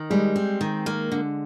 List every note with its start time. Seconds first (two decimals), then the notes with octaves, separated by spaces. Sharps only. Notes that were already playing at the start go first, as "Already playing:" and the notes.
Already playing: D#3
0.10 G3 G#3
0.36 C4
0.61 D#3
0.86 A#3
1.12 D3